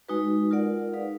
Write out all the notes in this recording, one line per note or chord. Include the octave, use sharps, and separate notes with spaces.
G#3 D#4 F#4 B4
F4 A#4 D5 F#5
D#4 G#4 B4 F5